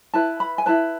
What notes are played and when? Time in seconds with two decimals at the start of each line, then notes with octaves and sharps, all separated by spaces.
0.13 E4 B4 A5
0.40 B5
0.58 G#5
0.66 E4 B4 A5